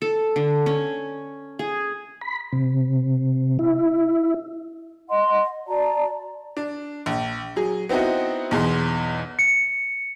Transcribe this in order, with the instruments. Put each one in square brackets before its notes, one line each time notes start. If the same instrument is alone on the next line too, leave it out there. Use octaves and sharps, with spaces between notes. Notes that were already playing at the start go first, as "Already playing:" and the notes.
[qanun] A4
D3
C#4
G#4
[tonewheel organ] B5
C3
E4
[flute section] D#5 F#5 C6
F#4 D5 A5 A#5
[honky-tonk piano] D4
A#1
F#3 G#4
B3 C4 D#4 E4 F#4
B1 E2 G#4 C6
[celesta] C#7